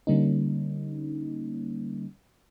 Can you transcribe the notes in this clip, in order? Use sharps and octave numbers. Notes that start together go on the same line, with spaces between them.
D3 G3 A#3 C#4 D#4